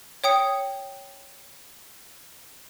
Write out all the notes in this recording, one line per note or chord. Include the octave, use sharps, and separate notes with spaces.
C#5 G5 D#6 C#7